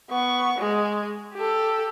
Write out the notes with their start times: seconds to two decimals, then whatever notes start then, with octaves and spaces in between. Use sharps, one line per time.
0.10 B3 C#6
0.58 G#3
1.35 G4 A4